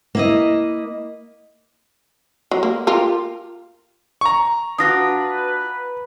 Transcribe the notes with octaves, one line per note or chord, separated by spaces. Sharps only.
A#3 E4 D#5
F#3
A#3
F4 G4 A#4
A#5 C#6
D4 F4 F#4 B4 D#6 A#6